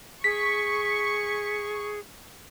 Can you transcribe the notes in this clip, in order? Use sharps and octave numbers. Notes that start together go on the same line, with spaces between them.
G#4 C#6 B6